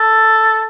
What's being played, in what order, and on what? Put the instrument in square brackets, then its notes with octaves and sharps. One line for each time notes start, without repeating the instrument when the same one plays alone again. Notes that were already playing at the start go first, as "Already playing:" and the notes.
Already playing: [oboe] A4